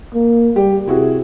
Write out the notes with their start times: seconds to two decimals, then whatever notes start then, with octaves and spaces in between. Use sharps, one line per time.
0.14 A#3
0.56 G3 G4
0.87 C3 E4 F#4 G#4